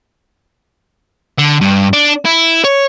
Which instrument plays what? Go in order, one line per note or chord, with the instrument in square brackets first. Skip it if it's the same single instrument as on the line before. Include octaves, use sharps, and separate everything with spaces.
[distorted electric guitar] D3
G2
D4
E4
C#5